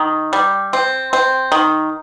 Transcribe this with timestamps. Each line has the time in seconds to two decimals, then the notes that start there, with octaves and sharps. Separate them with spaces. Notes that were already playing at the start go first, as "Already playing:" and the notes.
Already playing: D#3
0.33 G3
0.73 C4
1.13 C4
1.52 D#3